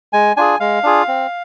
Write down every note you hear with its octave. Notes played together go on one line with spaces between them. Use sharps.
G#3 G#5
D4 F4 G#4 G#5
G#3 F5
D4 F4 G#4
C4